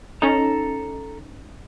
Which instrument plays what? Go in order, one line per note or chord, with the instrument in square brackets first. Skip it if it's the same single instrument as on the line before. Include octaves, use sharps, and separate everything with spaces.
[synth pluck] C#4 D#4 [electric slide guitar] A4 A#5